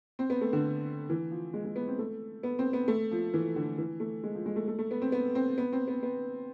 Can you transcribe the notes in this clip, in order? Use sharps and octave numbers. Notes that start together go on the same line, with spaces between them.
C4
B3
A3
D3
E3
F3
G#3
G#3
B3
C4
A3
B3
C4
B3
A3
F3
E3
D3
E3
A3
G#3
F3
G#3
A3
A3
A3
B3
C4
B3
C4
B3
C4
B3
B3